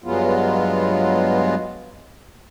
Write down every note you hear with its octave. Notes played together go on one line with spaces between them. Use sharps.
G2 F#3 G#3 B3 F4